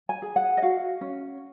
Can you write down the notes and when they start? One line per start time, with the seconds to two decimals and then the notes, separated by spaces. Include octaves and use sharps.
0.09 G#5
0.22 G#4
0.36 F#5
0.57 D#5
0.62 F#4 F5
1.01 C#4